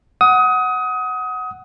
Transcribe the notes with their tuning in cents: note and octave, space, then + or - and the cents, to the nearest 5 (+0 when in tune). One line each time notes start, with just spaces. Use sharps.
F#5 +0 D#6 +25